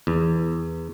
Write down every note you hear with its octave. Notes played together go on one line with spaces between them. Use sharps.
E2